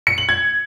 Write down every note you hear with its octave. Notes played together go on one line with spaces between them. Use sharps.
C#7
F#7
G#6